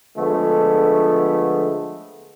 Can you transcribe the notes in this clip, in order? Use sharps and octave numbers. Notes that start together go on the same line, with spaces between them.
D3 F3 G#3 A3 B3